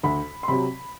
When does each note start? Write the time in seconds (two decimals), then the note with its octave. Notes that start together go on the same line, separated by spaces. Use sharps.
0.03 D2 B5
0.43 C6
0.48 C3 F#3 B5